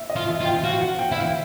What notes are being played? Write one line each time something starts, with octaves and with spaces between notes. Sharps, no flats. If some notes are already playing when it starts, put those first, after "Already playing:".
Already playing: E5
D#5
F4
E5
F4
G5
F#4 F5
F#5
G5
E4 E5
F5